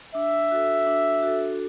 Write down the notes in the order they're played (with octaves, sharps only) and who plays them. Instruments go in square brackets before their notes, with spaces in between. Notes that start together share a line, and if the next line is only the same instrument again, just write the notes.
[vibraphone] D4 [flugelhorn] E5
[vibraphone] F#4 A4
D4
F#4 A4